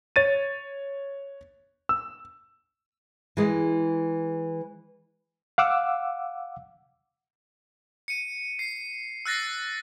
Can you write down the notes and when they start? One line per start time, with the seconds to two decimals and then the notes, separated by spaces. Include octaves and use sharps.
0.16 C#5 A6 D#7
1.89 E6
3.37 E3 G#3
5.58 F5 F#5 D6 E6
8.08 C#7 D#7
8.59 C7
9.26 E6 F#6 A6 A#6 C7